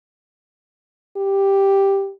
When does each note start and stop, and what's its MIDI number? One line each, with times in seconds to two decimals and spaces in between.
1.17 2.12 67